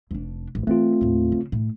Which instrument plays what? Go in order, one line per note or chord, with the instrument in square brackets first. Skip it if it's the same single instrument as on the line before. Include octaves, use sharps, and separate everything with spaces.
[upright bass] F1 D4
A1
[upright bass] E3 [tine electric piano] A3 C4 F4
[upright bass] D#2 A2
C#3
A2